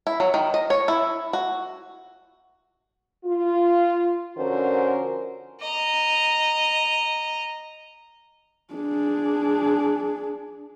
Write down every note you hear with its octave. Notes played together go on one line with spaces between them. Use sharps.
E4
F#3
D#3
D#5
C#5
E4
F#4
F4
D3 F3 C#4 F#4 A#4 C5
D#5 A#5
D4 G#4